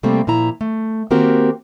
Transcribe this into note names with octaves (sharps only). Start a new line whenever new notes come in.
C3 G3 A3 A#3 C4
A#2 F3 E4 A#5
A3
D#3 A#3 C4 F#4 G4 A#4